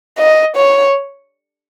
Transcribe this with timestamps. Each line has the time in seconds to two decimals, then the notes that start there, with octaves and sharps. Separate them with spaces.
0.18 D#5
0.56 C#5